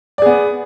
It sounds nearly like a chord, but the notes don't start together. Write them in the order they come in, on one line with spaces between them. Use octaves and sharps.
D5 G#4 B3